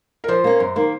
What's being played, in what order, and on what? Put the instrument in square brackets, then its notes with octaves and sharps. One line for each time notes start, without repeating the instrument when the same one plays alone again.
[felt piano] A#4
[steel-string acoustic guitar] F3 [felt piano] C5
[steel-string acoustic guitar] A#3 C#4
F#2
D#3 A#3